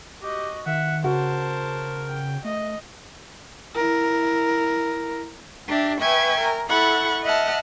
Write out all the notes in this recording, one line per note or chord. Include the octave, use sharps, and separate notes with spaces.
F#4 G4 D#5
D#3 E5 F#5
C#3 F#4 A#4 C5 A5
G5
A3 D#5
E4 A#4
D4 G4 E5
B4 E5 G5 G#5 C#6 G#6
A#4
E4 A4 F#5 B5 C#6
D#5 E5 F#5 A5 F6